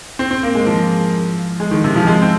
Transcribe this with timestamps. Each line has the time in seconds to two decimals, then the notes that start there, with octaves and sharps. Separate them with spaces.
0.19 C4
0.31 C4
0.43 A#3
0.55 G#3
0.66 F3
1.60 G#3
1.71 D#3
1.84 C3
1.96 F3
2.07 G#3
2.22 C4